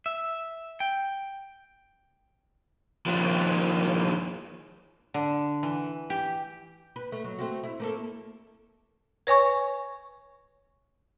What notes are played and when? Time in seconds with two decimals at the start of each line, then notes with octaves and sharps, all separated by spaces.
0.06 E5
0.80 G5
3.06 D#2 F3
5.14 D3
5.63 E3
6.10 G4
6.96 B4
7.12 A3
7.24 F#3
7.39 A3 C4 F#4
7.64 E4
7.80 A3 A#3 A4
9.27 B4 C#5 G#5 C#6